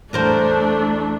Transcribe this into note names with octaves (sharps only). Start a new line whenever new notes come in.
E2 A3 D4 A#4 C5